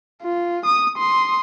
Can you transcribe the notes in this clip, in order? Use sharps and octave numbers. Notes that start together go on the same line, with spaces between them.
F4
D#6
C6 D#6